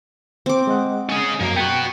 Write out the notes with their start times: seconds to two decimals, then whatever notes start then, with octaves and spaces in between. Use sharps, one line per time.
0.46 C4 D6
0.67 G#3 D#5 F#5
1.09 C#4 G#4
1.41 F#2 F#3 A#3 A#5
1.56 B3 F#4 G5